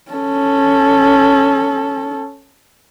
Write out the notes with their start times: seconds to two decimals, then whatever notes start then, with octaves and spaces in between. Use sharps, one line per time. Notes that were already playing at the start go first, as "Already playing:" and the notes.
0.11 C#4 A4